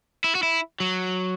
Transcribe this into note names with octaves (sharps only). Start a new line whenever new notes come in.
E4
F#4
E4
F#3